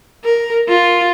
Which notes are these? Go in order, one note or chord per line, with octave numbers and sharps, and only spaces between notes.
A#4
F4